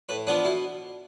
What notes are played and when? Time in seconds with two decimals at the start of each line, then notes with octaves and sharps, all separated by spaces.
0.09 A2 B4
0.27 F3 B3 D4 B4
0.45 B2 E4